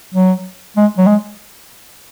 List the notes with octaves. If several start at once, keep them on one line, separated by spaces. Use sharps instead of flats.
F#3
G#3
F#3
G#3